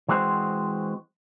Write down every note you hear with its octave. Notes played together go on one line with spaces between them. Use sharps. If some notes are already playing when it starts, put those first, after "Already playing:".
E3 G#3 C4 F#4 C5